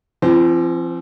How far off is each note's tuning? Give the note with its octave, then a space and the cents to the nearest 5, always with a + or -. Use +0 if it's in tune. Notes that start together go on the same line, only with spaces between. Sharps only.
F3 -40 C4 +10